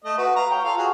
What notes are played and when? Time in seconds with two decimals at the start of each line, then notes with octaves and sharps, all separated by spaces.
0.05 A3 D#5
0.18 F#4 B4
0.36 F5 A#5
0.51 C#5 G5
0.64 F4 A4 F5
0.78 F#4 G#4